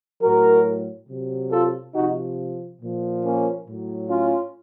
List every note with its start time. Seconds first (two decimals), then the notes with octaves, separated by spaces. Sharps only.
0.22 A2 F#3 F#4 A#4
1.09 C3 F#3
1.52 F4 A4
1.95 C3 F3 D#4 F#4
2.81 A#2 F3
3.24 A#3 C#4
3.67 A2 F#3
4.10 C#4 F4